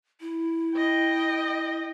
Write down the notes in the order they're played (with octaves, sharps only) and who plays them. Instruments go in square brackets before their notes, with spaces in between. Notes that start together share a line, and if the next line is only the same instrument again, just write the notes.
[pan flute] E4
[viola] D#5 G5